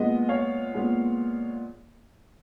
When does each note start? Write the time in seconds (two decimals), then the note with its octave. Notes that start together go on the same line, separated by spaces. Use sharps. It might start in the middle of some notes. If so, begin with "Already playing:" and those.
Already playing: A#2 G#3 B3 D#5
0.29 C#5 F5
0.74 A#2 G#3 B3